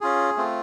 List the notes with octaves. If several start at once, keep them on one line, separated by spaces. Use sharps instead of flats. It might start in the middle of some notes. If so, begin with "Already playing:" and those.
C#4 F4 G#4
A3 C4 F4